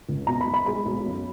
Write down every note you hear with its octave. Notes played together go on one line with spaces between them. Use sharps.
C#2
B2 A#5
B5
B1
B5
G#3 B5
B1
F#2